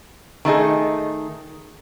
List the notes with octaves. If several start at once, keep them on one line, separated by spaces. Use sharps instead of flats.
D#3 A3 D#4 G#4